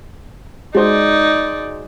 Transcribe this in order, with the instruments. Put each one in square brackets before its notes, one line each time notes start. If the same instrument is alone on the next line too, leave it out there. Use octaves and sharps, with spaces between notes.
[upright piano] G#3 F#4 C5 [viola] D#4 D5